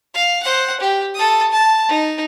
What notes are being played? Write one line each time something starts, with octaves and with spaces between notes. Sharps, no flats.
F5
C5 F#5
G4
A4 D#6
A5
D#4